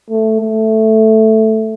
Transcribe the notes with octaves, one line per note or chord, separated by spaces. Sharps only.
A3
A3